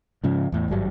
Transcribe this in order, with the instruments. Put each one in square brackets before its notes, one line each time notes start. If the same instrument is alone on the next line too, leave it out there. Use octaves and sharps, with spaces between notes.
[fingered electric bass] G#2 C#3 F3
E2 A2
G#1 G2 F#3 G3